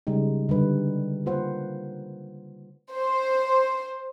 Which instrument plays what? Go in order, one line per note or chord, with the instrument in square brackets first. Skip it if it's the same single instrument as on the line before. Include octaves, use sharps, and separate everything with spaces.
[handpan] C#3 G3 G#3 D#4
D3 G3 B4
A#3 F4 B4 C5 F#5
[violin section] C5